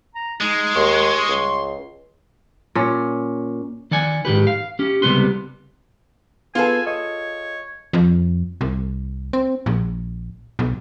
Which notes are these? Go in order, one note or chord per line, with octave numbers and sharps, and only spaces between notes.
A#5
G#3 D#4
D#2 C6 C#6
C#2
A#2 C#4
D#3 D5 F#5 G#5
G#2 D#3 G4 B4
F5
C#4 G4
C#2 C3 G3 B3 B4 C6
B3 F4 G#4 A4 B4 G#5
C#5 D#5
F2
C2
C4
A#1
B1